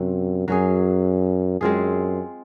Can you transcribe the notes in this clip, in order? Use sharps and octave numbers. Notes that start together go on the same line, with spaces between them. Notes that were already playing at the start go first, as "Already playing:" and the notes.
Already playing: F#2 C3 F#3 C4
F#2 F#3 C#4 G#4
F#2 G#3 C4 F4 G#4